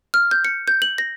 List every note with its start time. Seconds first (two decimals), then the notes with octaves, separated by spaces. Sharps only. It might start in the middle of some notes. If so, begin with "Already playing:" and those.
0.14 F6
0.31 G6
0.45 C#7
0.68 G6
0.82 F#7
0.98 A#6